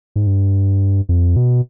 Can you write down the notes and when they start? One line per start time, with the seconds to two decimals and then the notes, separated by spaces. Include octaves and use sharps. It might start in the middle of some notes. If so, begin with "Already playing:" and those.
0.16 G#2
0.27 G2
1.09 F2
1.36 B2